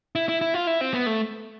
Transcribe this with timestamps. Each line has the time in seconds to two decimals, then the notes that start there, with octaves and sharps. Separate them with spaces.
0.15 E4
0.29 E4
0.41 E4
0.54 F4
0.67 E4
0.81 C4
0.94 B3
1.06 A3